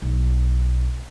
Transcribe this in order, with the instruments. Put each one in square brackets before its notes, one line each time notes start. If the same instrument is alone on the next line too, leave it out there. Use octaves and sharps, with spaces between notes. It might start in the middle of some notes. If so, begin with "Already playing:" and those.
[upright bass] B1